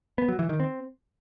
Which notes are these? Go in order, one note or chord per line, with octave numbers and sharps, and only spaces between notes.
B3
F#3
E3
D#3
C4